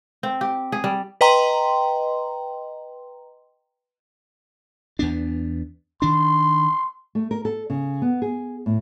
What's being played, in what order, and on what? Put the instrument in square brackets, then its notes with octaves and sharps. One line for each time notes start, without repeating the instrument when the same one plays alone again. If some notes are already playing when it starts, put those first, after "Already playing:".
[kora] C4
G4
G#4
G3
[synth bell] B4 D#5 G5 A#5 C6
[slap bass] E2 B3 D4
[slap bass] D#3 D4 [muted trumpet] C6
[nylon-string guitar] A3
A#4
A4
C#3
B3
G#4
A2